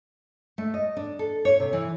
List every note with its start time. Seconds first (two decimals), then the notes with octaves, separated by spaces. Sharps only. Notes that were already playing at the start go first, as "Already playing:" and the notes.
0.58 A3
0.74 D#5
0.97 D4
1.19 A4
1.45 C#5
1.60 C3
1.73 E3